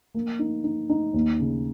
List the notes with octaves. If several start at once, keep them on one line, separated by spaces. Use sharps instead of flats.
A#3
D#4
D#4
D#4
D#2
C#3